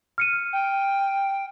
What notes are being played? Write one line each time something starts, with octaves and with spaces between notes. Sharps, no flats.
F6 C#7 D#7
G5